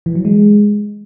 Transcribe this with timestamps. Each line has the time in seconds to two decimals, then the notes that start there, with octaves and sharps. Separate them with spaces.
0.06 E3
0.15 F#3
0.25 G#3